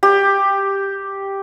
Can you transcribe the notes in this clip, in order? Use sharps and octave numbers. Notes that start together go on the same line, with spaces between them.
G4